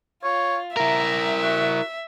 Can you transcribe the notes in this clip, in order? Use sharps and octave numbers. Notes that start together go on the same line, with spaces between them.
F4 C#5
E4 A#4 E5 A#5
F#4